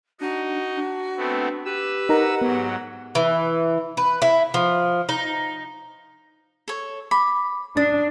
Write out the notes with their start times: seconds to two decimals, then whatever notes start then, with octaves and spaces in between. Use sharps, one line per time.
0.21 D4 D#4 F#4 D#5
0.77 D4
1.17 A3 B3 C4
1.65 G4 B4 E6
2.09 D#4 A#4 F#5 A#5
2.41 G#2 F#3 B3
3.15 E3
3.97 B4
4.22 E4
4.54 F3
5.09 D#4
6.68 A4 C#5
7.11 B5 D6
7.77 D4 D#6 A6